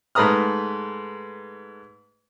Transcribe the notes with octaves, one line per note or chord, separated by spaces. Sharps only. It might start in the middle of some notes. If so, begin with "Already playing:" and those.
G#2 A3 B4 A#5 D#6 F6